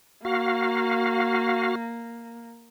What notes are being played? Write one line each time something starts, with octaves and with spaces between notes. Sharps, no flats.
A#3 F#4 F5